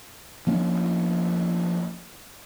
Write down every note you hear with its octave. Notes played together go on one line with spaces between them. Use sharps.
F3 A#3 C#4 D4